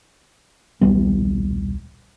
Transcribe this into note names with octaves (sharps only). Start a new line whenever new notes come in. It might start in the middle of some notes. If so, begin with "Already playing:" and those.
D#1 B1 G3 B3